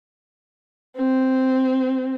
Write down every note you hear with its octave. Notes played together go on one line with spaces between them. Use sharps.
C4